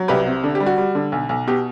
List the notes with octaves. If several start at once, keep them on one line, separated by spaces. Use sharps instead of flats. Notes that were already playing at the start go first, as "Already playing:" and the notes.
Already playing: F#3
C2 G4 B4
C3
D3
G4
G3
F#4
G3
D3
B1
B1
B2 G4